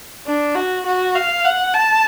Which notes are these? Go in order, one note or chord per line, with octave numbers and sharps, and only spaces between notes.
D4
F#4
F#4
F5
F#5
A5